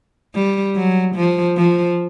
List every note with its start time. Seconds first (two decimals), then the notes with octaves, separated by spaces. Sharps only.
0.35 G3
0.75 F#3
1.15 F3
1.56 F3